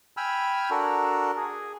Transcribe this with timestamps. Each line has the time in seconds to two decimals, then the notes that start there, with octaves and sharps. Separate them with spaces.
0.17 G5 G#5 B5 E6 F6
0.70 D4 F#4 A4 A#4
1.37 G#4